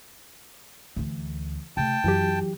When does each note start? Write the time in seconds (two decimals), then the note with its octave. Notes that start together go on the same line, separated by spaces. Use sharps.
0.96 D2 E3
1.77 C3 A3 G5 A5
2.04 F#2 E3 F#3 G4